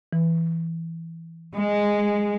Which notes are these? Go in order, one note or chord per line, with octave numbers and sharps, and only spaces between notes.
E3
G#3